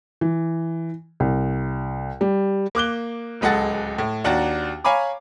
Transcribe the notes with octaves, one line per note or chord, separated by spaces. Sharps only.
E3
C2
G3
A#3 D6 F#6 G7
D1 C#2 G#3 A4 F#5 A6
A2
D#2 D4 F#4 F#5 A#5 A6
C#5 F5 G#5 A#5 B5 D6